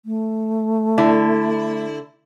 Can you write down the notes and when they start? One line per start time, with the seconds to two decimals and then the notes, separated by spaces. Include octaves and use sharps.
0.05 A3
0.98 D3 E4